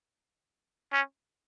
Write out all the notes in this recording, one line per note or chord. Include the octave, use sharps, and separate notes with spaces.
C#4